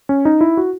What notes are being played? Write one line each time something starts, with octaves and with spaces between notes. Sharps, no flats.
C#4
D#4
E4
F#4